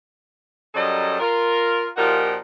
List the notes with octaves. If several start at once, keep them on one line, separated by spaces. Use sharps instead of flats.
F#2 F#3 G3 A4 D#5
F4 A#4
A#2 F3 D#4 F#4 G4 A#4